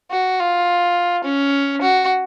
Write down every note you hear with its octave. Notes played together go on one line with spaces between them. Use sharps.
F#4
F4
C#4
F#4